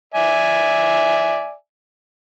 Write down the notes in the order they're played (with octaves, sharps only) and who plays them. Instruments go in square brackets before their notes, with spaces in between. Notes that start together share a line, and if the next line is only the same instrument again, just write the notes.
[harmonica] D5 E5 G#5